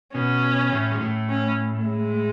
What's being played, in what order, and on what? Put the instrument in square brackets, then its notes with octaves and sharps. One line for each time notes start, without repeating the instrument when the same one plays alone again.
[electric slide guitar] B2 B3 [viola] C#4
[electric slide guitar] A2 A3
G#3
A2 A3
[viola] C#4
G#3